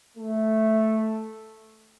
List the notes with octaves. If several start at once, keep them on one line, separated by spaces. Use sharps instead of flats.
A3